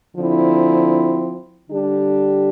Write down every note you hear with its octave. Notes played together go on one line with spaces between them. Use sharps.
D3 F3 C4 E4
D3 G3 D4 G4